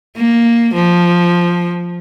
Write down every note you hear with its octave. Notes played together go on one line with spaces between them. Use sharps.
A#3
F3